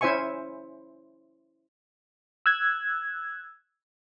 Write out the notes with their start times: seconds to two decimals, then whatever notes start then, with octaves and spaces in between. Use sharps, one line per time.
0.01 C#4 E4 C5 E5 G#5 C#6
2.46 E6 F#6 G#6